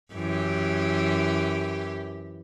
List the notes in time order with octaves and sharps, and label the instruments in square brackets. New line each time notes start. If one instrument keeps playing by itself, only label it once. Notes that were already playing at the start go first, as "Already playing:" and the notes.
[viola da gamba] F#2 E3 G4